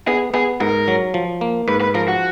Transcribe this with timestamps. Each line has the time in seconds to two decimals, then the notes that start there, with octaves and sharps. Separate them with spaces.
0.07 B3 G#4
0.34 B3 G#4
0.61 G#2 A#4
0.88 F#3
1.14 F3
1.41 A#3
1.68 G#2 B4
1.81 B4
1.95 F3 A#4
2.08 F#4